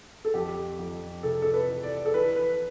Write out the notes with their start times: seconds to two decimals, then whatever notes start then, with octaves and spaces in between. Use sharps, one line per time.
0.25 A4
0.34 F2 G4
0.79 F2
1.23 C3 A4
1.42 A4
1.53 B4
1.68 E3
1.83 D5
2.06 A4
2.14 E3 B4
2.36 B4